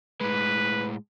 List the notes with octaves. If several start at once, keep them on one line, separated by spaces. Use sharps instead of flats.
A2 G#3 B4